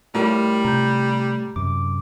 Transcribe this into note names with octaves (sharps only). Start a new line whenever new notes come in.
A2 G3 F4 A#4
C3 A#5 G6
F#2 C3 D6